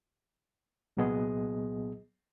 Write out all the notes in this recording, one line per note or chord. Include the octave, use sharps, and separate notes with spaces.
C2 A#2 F#3 B3 G#4 D#5